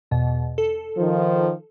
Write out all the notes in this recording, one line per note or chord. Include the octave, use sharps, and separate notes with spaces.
E2 B2
A4
D#3 F3